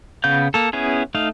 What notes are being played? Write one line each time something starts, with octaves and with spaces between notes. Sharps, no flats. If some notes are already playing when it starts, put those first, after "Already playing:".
C#3 B3 F5 G6
A#3 A4
B3 C#4 E4 G#4
A3 D#4 F5